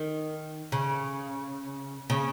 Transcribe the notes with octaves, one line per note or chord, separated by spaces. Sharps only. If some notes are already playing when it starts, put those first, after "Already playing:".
Already playing: D#3
C#3
C#3